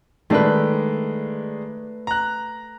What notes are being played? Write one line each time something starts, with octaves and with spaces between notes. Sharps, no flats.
D#3 G#3 A3 D4 B4
A#5 F#6